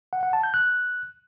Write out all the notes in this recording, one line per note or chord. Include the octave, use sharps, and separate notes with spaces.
F#5
F#5
A5
G6
F#6